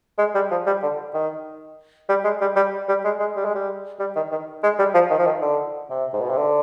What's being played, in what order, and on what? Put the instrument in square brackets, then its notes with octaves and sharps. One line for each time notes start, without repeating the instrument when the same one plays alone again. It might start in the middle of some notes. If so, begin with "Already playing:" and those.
[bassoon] G#3
G3
F3
G3
D3
D#3
G3
G#3
G3
G3
G3
G#3
G#3
G3
G#3
G3
G3
D#3
D#3
G#3
G3
F3
D#3
F3
D#3
D3
C3
G#2
B2
C3
D3